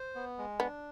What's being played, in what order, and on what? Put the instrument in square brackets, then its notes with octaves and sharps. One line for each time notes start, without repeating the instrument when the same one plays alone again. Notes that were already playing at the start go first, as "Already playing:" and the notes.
Already playing: [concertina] C5
B3
G#3
[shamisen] B3 [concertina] D4